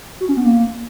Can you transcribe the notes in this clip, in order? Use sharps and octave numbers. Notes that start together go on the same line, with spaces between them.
F#4
C#4
B3
A#3